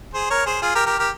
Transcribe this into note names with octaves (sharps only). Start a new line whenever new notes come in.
G#4 C5
A#4 C#5
G#4 C5
F4 G#4
G4 A#4
G4 A#4
G4 A#4